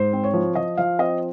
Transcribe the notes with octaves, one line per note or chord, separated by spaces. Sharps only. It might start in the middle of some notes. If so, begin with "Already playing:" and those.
Already playing: G#2 C5
C4
C#5
F3
F3 D#5
F3 F5
C4 D#5